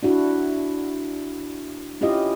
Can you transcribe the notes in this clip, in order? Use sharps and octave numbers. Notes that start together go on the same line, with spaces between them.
D4 E4 F#4
C#4 E4 F4 G4 D#5